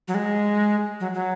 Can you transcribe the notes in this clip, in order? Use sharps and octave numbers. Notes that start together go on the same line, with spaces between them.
F#3
G#3
F#3
F#3